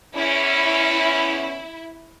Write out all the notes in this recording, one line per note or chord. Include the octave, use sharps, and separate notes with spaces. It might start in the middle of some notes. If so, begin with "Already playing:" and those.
E2 C#4 E4